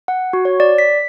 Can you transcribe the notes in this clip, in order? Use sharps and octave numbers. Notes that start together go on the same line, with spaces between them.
F#5
F#4
C#5
D5
B6